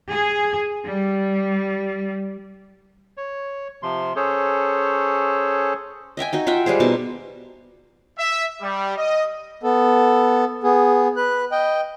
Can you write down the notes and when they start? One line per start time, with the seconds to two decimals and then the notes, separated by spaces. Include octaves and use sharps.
0.10 G#4
0.85 G3
3.17 C#5
3.83 C3 F3 C6
4.16 C#4 G#4 A4 C5 C#5
6.17 D#5 E5 G5 G#5
6.33 D#4 F#4 D#5
6.47 F4 E5 F#5 G5
6.66 G3 G#3 G#4 C5
6.80 B2 D#4 A5
8.18 E5
8.62 G3
8.97 D#5
9.63 B3 A4
10.64 B3 G#4
11.16 B4 F#6
11.52 D#5 G5